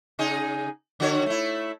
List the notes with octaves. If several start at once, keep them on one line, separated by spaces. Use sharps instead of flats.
C#3 D#4 G#4
D3 F#4 C#5
A3 E4